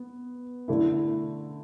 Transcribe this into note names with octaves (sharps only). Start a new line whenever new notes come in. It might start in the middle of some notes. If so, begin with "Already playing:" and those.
Already playing: B3
D3 A3 E4